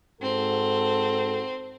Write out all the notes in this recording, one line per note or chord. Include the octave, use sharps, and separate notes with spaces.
G#2 C4 F#4 A4